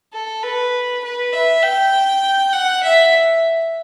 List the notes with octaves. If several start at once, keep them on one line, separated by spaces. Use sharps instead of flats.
A4
B4
B4
E5
G5
F#5
E5